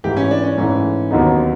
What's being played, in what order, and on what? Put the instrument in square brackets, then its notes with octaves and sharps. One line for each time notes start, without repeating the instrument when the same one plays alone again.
[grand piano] G#2 E3 A3 [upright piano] G4
[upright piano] C#4
D4
C#4
[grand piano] G#2 E3 A3 [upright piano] C#4
[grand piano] D#2 D3 F#3 B3 D#4